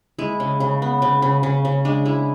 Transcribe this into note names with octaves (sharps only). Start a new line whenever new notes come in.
G#3 E4
C#3
C#3
B3
C#3
C#3
C#3
C#3
G#3 D4
G#3 E4